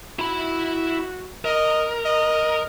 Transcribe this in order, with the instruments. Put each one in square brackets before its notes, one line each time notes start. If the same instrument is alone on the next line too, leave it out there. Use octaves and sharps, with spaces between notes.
[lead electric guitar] E4 B5 [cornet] F#4
[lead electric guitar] A#4 [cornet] D#5
[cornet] D#5